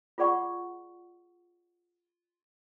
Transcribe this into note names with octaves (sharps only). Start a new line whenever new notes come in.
F4 G#4 D5 F#5 C#6